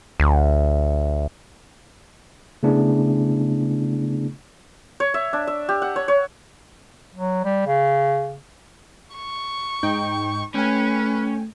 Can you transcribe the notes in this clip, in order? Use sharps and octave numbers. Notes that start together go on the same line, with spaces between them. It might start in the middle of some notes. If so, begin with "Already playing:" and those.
D2
C#3 A3 B3 D4 E4 G#4
C#5
E5
D4
E5
G4
F#5
C#5
C#5
F#3
G3
C#3
C#6
G#2 D#4 G5
A3 C#4 B4 G5 G#5